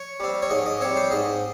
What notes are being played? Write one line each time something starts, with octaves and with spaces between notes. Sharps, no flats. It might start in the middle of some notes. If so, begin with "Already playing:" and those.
Already playing: C#5
G3 C4
C#5
G#2 D#5
D#5
G3 C4 C#5
C5
G#2 D#5